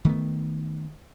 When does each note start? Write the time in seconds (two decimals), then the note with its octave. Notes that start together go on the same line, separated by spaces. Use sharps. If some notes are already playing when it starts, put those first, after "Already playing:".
0.05 D#3 A3 B3